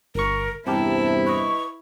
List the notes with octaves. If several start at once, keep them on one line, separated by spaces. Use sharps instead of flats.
G1 A#4 C#6
E2 G2 C3 C4 E4 G4 A#4 A5
B4 D#5 C#6